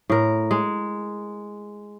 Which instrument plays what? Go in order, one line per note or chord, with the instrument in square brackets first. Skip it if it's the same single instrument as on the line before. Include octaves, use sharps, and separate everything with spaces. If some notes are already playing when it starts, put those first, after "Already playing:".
[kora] A2 A#4
G#3